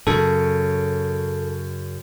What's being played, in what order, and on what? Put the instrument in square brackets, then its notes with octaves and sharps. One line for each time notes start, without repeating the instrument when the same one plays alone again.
[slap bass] F#2 C#3 [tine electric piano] A4